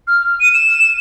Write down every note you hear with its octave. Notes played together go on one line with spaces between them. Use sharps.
F6
D#7
E7